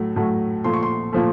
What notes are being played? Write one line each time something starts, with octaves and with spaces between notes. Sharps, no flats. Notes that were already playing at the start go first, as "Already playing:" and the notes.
Already playing: A2 F#3 A3
A2 F#3 A3
A#2 F3 A3 C6
C#6
C6
A#2 F3 A3